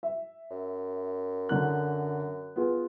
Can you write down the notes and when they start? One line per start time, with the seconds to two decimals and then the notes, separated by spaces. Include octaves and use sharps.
0.03 E5
0.51 F#2
1.49 D3 F#3 F#6
2.56 B3 F4 G#4